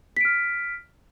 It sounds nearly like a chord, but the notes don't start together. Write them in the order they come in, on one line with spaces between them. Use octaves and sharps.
B6 D7 F6